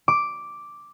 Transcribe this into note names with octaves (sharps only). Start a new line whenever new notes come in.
D6